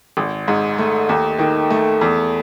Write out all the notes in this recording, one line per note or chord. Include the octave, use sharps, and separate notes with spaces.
G#1
G#2
A3
D#2
D#3
A3
E2